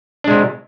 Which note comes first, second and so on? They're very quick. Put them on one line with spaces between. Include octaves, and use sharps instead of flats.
D4 G#3 C3